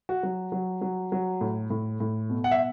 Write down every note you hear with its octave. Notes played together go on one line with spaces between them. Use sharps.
F#4
F#3
F#3
F#3
F#3
A2
A2
A2
B2
F#5
E5